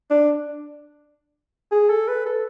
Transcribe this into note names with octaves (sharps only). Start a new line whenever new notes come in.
D4
G#4
A4
B4
A4